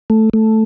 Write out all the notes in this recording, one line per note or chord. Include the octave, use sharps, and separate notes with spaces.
A3
A3